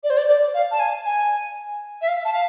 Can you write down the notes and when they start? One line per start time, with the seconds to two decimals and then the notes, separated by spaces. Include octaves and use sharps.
0.03 D5
0.10 C5
0.17 D5
0.28 D5
0.54 F5
0.71 A5
0.79 G#5
1.05 G#5
2.01 E5
2.08 F5
2.25 A5
2.33 F5